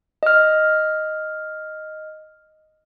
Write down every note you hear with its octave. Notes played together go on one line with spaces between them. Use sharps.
D#5 F6